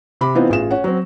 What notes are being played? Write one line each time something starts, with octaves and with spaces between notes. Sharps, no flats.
C3 B5 D6
E3 B3 C4 D#4 F4
A1 F4 G#4 E7
C#4 F#5
F#3 C4